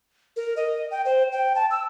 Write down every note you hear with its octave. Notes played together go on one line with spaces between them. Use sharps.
A#4
D#5
G5
C5
G5
A5
E6